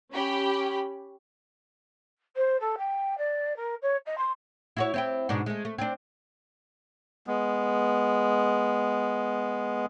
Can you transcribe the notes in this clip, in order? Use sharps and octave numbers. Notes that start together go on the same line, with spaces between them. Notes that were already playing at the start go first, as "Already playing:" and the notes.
C#4 G4 B5
C5
A4
G5
D5
A#4
C#5
D#5
C6
E4 F#4 C#5
C4 E4 G4
G#2 B2 D4
G#3 A3
A3
C4 D4
G#3 B3